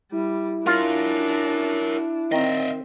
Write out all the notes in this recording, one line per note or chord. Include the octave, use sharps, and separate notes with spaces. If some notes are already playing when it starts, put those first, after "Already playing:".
G3 E4
D4 F4 F#4 A#4
D#3 C4 D#5 E5